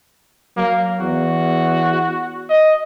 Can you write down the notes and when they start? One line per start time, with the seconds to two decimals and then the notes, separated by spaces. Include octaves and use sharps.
0.57 F#3 A#3
1.01 E2 F#4
2.50 D#5